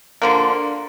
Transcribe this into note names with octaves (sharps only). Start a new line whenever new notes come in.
D3 F3 A#3